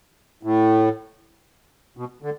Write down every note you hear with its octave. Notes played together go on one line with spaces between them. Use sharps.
A2
B2
D3